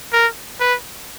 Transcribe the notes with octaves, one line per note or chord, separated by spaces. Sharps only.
A#4
B4